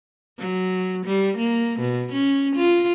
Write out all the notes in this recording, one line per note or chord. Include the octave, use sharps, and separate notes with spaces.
F#3
G3
A#3
B2
C#4
F4